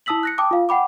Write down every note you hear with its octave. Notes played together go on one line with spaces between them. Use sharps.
E4 A5 D#6 E6 B6 F#7
F#6 A#6 C#7
G5 A5 D6 D#6
F4 F5
F#5 G5 B5 D6